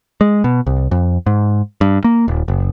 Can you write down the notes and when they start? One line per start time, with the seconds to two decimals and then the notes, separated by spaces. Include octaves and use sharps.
0.21 G#3
0.44 B2
0.67 C2
0.91 F2
1.26 G#2
1.81 G2
2.04 A#3
2.28 D#1
2.48 F#1